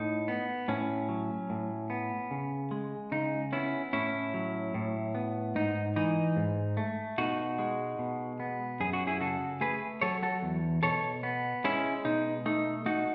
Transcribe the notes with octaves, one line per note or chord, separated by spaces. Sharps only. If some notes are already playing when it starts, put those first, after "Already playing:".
Already playing: A2 D#4
B3
A2 C#4
F#3
A2
B3
C#3
G#3
C#3 D#4
B3 C#4 E4
A2 C#4 E4
F#3
A2
B3
G#2 D#4
E3 D#4
G#2
A3
B2 D#4 F#4
G#3
B2
B3
F#2 G#4
F#4
E4 G#4
C#3 F#4 A4
A3 G#4 B4
F#3 A4 C#5
F#4 A4
E2
B2 A4 C#5
B3
G#3 C#4 E4
B2 D#4
A3 D#4
A3 D#4 F#4